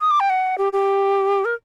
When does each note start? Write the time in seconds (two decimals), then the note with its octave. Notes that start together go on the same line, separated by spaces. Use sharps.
0.01 D#6
0.11 D6
0.20 G5
0.30 F#5
0.58 G4
0.73 G4
1.45 A#4